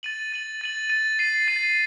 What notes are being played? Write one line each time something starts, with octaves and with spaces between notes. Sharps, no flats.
A6 D#7 F#7
A6 D#7 F#7
A6 D#7 F#7
A6 D#7 F#7
A6 C7 D#7
A6 C7 D#7